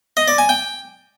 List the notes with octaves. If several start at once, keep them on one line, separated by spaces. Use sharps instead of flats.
D#5
D5
G#5
G5